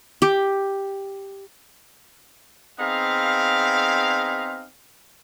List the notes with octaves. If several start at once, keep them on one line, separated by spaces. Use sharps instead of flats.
G4
B3 C4 D#4 G#4 F5